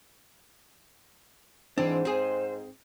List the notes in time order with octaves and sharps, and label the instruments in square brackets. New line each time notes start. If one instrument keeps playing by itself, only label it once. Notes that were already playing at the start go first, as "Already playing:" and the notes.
[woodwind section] G#2 [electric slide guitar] E3 D4 [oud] C4
[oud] C4 G#4 [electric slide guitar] C5